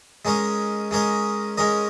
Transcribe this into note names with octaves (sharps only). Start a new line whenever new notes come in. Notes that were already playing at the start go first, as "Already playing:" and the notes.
G#3 C#4 A#4 D#5
G#3 C#4 A#4 D#5
G#3 C#4 A#4 D#5